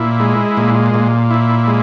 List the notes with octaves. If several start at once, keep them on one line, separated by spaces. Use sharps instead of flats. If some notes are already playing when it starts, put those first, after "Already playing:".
Already playing: A#2 E4
G#3
A#2
A#2
E4
G#3